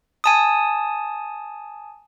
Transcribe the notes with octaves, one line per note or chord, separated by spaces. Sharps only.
G#5 A5 D#6